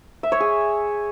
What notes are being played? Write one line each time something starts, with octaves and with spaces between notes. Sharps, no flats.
E5
C#5
G#4